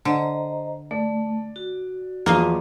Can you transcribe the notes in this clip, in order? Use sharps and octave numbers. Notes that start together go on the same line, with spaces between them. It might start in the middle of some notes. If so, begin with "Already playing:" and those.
D3 C5 D#5 A#5
A3 D5
F#4
E2 F3 A#3 D#5 F5